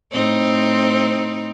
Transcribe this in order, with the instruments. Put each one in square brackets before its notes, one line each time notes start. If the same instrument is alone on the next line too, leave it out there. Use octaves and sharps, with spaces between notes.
[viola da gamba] A2 C4 D#4